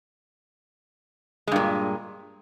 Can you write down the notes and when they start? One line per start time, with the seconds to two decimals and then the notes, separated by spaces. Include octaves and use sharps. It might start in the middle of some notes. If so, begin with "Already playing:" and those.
1.47 G#3
1.52 G2
1.56 A#2